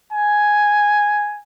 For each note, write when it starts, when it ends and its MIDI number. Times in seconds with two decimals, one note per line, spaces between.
0.13 1.41 80